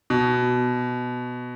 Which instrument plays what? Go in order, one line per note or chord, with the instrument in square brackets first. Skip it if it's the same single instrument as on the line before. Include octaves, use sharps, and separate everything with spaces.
[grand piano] B2